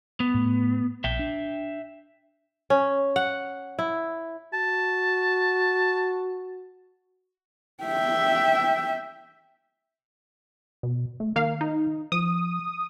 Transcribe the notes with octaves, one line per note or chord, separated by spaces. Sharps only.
B3
A2
A#1 E5 G5
D4
C#4
F#5
E4
F#4 A5
E5 G5
B2
A3
D#3 A#3 F5
D#4
F3 D#6